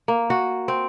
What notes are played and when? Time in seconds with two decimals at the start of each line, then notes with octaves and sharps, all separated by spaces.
0.08 A#3
0.30 F#4
0.68 C4